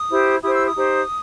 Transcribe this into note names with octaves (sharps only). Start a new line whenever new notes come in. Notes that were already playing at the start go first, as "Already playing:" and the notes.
Already playing: D#6
E4 G4 C5
E4 G4 C5 D#6
E6
D#6
D#4 G4 C5